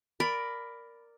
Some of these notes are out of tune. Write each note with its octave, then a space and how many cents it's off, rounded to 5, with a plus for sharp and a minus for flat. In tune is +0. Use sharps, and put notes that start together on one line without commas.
A#4 +0 D5 +0 B5 +10